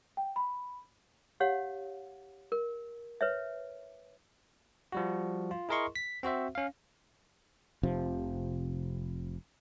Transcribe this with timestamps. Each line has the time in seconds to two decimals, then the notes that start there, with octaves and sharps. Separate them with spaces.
0.17 G5
0.36 B5
1.40 G4 C#5 F5 F#5
2.52 A#4
3.21 B4 C#5 E5
4.92 F3 G3 F#4
5.51 F4
5.69 E4 G#4 A#4 D#5 C6 C#6
5.96 B6
6.23 C4 F#4 C5 E5
6.55 C#4 F5
7.83 F1 C3 F3